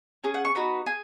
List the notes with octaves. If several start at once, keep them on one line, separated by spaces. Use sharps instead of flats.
C#4 G#4
F#5
C#6
B3 D#4 F#4 B5
G#4 G#5